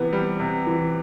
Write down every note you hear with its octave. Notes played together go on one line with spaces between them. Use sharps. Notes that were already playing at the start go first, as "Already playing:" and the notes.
Already playing: C3 E3 B3
G3
C3
E3